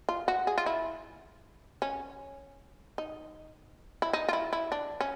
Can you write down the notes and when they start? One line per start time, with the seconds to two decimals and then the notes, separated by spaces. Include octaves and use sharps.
0.09 F4
0.28 F#4
0.47 G#4
0.58 F4
0.66 E4
1.82 C#4
2.98 D#4
4.02 E4
4.13 D#4
4.29 F4
4.33 E4
4.53 E4
4.72 D4
5.01 C#4